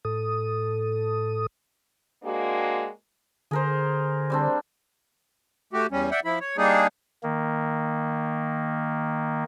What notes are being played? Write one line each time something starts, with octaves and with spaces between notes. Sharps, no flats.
A2 A4 D#6
G#3 A#3 C4 D4 F#4
D3 G#4 A#4 C5
G3 C4 D4
A3 F#4 G4
E2 G3 C#4
D5 E5 F#5 G5
F3 E4 B5
C#5
G3 A#3 D4 D#4 G#4
D#3 A#3